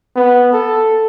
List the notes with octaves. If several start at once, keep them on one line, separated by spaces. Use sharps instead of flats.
B3
A4